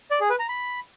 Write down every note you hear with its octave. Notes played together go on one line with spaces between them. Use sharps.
D5
G#4
B4
A#5
B5